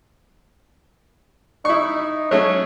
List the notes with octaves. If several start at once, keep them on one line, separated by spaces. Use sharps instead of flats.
D#4 E4 C#6
F#3 A3 C#4 C#5